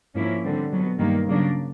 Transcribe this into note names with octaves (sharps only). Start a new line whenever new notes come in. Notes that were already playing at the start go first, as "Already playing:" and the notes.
G#2 F3 A#3 C#4 E4
D3 G3 C4
B2 F#3 B3
G2 D#3 G3 A#3
C#3 F#3 A#3 D4